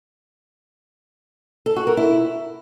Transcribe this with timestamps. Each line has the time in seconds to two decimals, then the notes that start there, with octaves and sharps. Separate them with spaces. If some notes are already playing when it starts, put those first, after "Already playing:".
1.66 A4
1.76 F#4
1.87 A#4
1.97 E4